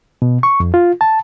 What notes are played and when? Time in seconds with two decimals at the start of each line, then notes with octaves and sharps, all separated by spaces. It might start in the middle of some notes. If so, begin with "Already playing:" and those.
0.22 B2
0.43 C#6
0.60 F2
0.74 F4
1.01 A5